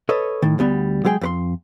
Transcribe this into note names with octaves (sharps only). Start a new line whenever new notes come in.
A4 B4 C#5 D#5
A2 D#3
D2 G3 B3
F#3 G#3 G#4 G5
F2 B4 C6